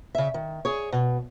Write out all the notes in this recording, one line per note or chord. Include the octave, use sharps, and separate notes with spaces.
C#3 E5
D#3
G#4 C#5
B2